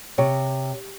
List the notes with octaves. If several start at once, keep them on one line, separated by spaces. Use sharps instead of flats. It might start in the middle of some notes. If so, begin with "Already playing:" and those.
C3 C#5